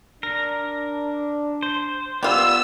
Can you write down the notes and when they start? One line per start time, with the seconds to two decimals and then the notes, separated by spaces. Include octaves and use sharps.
0.23 D4 A#4
1.62 C5
2.23 G3 B3 F4 E6